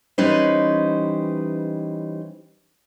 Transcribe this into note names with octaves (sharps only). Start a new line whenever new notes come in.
E3 G3 C#4 D#4 B4 C5